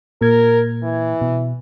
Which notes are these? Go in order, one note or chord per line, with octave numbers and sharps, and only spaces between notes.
A#2 A#4 G#6
E3
B2